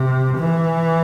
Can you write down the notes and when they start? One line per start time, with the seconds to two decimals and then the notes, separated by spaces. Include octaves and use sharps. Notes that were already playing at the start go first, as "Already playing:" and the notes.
Already playing: C3
0.37 E3